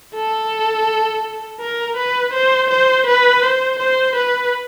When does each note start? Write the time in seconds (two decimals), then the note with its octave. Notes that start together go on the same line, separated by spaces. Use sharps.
0.15 A4
1.61 A#4
1.97 B4
2.33 C5
2.70 C5
3.07 B4
3.42 C5
3.79 C5
4.16 B4